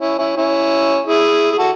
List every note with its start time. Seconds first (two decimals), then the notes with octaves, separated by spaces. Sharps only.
0.01 C#4 E4
0.18 C#4 E4
0.37 C#4 E4
1.06 E4 G#4
1.52 G#4
1.58 F#4 A4